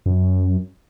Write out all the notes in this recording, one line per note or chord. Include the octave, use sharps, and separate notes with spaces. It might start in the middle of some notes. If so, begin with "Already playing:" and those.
F#2